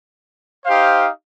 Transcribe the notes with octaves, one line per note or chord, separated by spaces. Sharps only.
D#4 G4 C5 F5